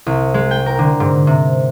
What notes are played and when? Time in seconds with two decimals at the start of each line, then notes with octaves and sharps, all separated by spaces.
0.06 C2
0.34 G#3
0.51 G5
0.66 A#4
0.79 D3
1.00 G#2
1.27 C3